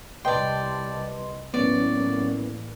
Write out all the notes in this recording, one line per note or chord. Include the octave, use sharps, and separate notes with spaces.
C2 C3 B4 D5 D#5 G5 A5 C6
A2 E3 F#3 A#3 B3 C#4 C#5 D5